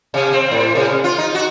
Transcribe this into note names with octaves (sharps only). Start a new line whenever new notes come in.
C3
C4
A2
C3
F4
D#4
F#4